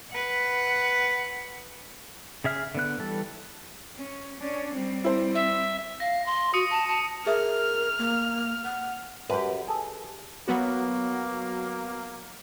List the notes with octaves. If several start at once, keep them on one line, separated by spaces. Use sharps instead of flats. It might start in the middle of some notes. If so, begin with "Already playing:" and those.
B4 F#5
C#3 G#4 E5 F6
D3 B3 F#6
E3 G3 A4
C#4
C#4 D4
G3 C4
E4 C5
E5
F5 A#6
C6
F#4 D#6 C#7 D#7
A5
A5
G#4 A#4 E5 D#6 F6
A#3
F#5
F#2 G4 B4
G#4 A4
F#3 A#3 B3 F#4